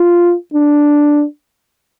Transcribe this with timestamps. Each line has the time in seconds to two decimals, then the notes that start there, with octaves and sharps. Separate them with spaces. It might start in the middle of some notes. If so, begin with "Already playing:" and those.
Already playing: F4
0.54 D4